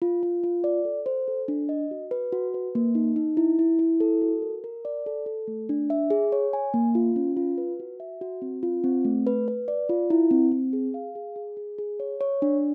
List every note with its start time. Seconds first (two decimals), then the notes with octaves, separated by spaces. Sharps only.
0.02 F4
0.23 F4
0.44 F4
0.64 D5
0.85 A4
1.06 C5
1.28 A4
1.48 D4
1.69 D#5
1.91 F#4
2.11 B4
2.32 F#4
2.54 B4
2.75 A#3
2.95 D#4
3.16 D#4
3.37 E4
3.59 E4
3.79 E4
4.00 A4
4.21 F#4
4.42 A#4
4.64 A#4
4.85 D5
5.06 A4
5.26 A4
5.48 A3
5.69 D4
5.90 E5
6.10 G#4
6.32 C#5
6.53 G#5
6.74 A#3
6.95 F4
7.16 C#4
7.37 F4
7.58 B4
7.80 F#4
8.00 E5
8.21 F#4
8.42 C4
8.63 F4
8.84 C4
9.05 A3
9.27 B4
9.48 B4
9.68 D5
9.89 F4
10.10 E4
10.31 C4
10.52 C4
10.73 G#4
10.94 F5
11.15 G#4
11.36 G#4
11.57 G#4
11.78 G#4
12.00 C#5
12.21 C#5
12.42 D4